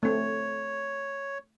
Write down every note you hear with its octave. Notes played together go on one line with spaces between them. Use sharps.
A3 C4 C#5